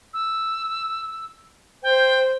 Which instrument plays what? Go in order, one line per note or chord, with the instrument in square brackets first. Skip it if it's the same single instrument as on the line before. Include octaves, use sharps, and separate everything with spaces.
[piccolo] E6
[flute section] C5 [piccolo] G5